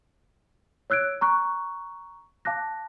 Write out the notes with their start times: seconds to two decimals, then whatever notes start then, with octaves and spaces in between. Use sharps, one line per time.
0.90 C#5 E6 F#6 G#6 D7
1.21 A#5 C#6 F#6
2.45 F5 A5 D6 F#6 A#6